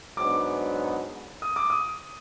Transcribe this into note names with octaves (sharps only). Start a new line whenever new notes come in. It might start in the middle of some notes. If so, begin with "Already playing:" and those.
G#2 F#3 B3 D4 D6
D#6
D6
D#6